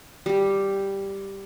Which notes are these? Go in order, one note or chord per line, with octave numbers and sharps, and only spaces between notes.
G3 G4